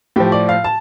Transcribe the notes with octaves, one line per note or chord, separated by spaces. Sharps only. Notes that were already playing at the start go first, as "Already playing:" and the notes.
A2 F3 G4
D5
F5
A5